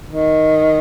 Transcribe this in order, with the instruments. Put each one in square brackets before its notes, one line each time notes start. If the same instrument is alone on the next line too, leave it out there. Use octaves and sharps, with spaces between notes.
[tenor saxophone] D#3